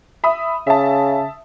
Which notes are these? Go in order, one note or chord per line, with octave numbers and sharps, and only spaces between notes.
E5 B5 D#6
C#3 E5 A5